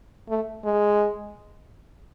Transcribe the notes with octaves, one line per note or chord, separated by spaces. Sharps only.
A3
G#3